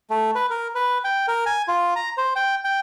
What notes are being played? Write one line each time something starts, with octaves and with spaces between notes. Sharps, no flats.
A3
B4
A#4
B4
G5
A#4
G#5
F4
A#5
C5
G5
G5